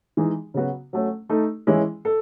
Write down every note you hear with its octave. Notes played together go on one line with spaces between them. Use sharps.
E3 G#3 D#4 G#4
C#3 F#3 B3 F#4
F#3 A3 C#4
A3 D#4 A4
E3 G#3 C#4 E4
A4